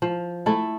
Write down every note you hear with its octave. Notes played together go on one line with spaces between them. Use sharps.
F3
A3 E4 A4